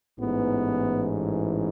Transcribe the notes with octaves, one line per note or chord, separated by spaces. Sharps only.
A1 G#2 E3 B3